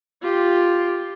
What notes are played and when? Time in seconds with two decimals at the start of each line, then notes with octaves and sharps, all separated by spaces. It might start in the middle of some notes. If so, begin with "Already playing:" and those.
0.22 F4 G4